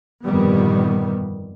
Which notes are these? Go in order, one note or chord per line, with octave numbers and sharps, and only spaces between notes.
G1 F2 A#2 D#3 G3 B3